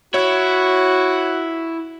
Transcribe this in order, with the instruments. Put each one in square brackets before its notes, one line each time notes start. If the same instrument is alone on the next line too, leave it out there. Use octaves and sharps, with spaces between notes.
[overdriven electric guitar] E4 [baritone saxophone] F#4 [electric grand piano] C#5